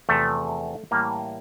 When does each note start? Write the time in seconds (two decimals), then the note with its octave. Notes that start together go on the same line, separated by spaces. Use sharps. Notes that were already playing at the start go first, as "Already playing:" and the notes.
0.09 E2 C3 F3 A3
0.91 A2 E3 G3 A#3